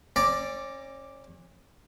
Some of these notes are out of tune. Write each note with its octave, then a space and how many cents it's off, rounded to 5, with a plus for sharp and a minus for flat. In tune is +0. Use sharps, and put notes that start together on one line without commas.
C#4 -35 D5 +0 A#5 +10